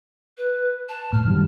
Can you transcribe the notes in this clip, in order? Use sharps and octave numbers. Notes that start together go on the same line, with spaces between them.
B4
A5
A2 F6
F#2 D#3 G3